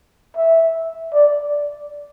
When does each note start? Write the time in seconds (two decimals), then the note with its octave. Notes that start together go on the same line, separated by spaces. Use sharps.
0.37 E5
1.13 D5